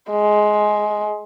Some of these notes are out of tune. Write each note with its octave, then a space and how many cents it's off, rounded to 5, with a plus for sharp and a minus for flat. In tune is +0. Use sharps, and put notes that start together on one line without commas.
G#3 +15